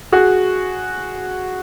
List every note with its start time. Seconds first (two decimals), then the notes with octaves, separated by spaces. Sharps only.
0.12 F#4 G#4